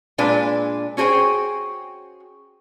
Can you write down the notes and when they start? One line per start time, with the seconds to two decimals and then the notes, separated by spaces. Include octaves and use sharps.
0.18 A#2 G#3 D4 B4
0.97 C#4 F#4 G#4 C5 G5